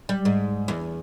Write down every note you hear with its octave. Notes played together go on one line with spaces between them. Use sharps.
G3
G#2
E2